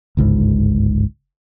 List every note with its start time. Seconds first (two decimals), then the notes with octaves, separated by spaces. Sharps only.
0.17 G1 C#2 G#2